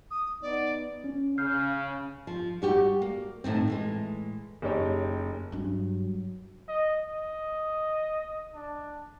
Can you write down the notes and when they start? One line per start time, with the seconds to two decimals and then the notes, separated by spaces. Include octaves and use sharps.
0.11 D#6
0.42 B3 D#4 D5
1.04 C#4
1.38 C#3 F6 G6 C7
2.27 F3
2.62 G3 F#4 G4
3.02 A#3
3.44 D#2 A2 D#3 C4
3.67 A2 E3 G#3
4.62 F#1 D#4 G4 C#5 G5
5.52 G2 F#3 D4
6.69 D#5
7.09 D#5
8.54 D4